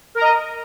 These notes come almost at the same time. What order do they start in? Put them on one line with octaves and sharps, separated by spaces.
A#4 A#5 D#5